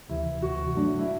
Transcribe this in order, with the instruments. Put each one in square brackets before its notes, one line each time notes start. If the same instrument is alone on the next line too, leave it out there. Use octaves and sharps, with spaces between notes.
[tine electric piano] D2 C3 E3 [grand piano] E4
[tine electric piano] D2 C3 E3 [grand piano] F#4
[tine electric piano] G2 F#3 A3 D4
[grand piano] E4